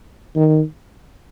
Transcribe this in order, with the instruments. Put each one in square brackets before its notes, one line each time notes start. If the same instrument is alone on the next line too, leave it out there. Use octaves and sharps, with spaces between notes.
[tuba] D#3